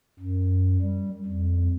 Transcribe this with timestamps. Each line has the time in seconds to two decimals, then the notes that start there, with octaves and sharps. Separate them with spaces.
0.19 F#2
0.82 G3
1.26 F2